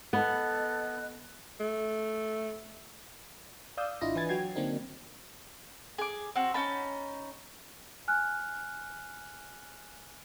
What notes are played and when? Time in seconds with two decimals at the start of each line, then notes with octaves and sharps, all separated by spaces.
0.13 B3 A4 D#5 F#6
1.60 A3
3.77 D5 F5 D#6 E6 G6
4.01 G#1 D4 E4 F4 D#5 A#6
4.15 E3 D4 B4 G#5 G#6 A6
4.29 F#3 F#4 G5 G#6 C7
4.55 D3 F#3 A#3 C4 D4 D#4
5.98 G#4 D6
6.36 C4 F#4
6.54 C#4 D#4 A5 B5
8.08 G#5 F6 F#6